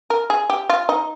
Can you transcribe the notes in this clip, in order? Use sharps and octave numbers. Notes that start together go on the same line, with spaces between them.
A#4
G#4
G4
F4
D#4